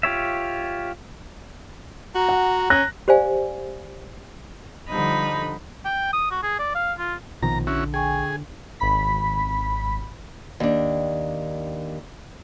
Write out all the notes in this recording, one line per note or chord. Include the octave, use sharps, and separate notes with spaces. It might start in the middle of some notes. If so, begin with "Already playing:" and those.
F4 G4 C#5 E5
F#4 A#5
F#5
C#4 F#6 A#6
G4 C5 D5 F5 G#5
D3 F3 G3 D#4 B5
G5
D#6
F#4
G#4
D5
F5
F4
A#1 B2 D#3 F3 A#5
D3 C#4 E4 F#4
G#4 G5 G#5 C#6
G#1 B5 B6
D#2 D4